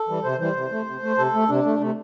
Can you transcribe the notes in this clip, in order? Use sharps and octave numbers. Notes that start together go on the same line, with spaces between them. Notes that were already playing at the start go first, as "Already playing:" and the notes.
Already playing: A4
E3 G3
C3 C5
E3 G3 C5
C3
A3
C3
A3
C3 A4
A3
C3 D4
A3
C3 A3